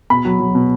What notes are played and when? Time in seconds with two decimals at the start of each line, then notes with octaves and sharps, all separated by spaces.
0.10 B2 B5
0.25 F#3
0.40 F#3
0.55 B2